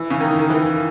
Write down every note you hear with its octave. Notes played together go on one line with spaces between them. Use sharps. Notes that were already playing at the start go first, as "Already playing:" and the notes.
Already playing: E3
C#3
D#3
D#3
E3